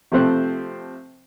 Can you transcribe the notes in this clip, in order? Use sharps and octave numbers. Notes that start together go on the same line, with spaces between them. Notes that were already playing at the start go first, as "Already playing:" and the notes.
C3 F3 A3 C4 C5 F#6